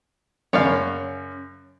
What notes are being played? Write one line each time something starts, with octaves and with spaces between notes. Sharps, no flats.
F#2 C#3 C#5 D5 F5